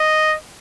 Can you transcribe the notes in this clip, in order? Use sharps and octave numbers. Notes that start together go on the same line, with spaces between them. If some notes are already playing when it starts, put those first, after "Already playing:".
Already playing: D#5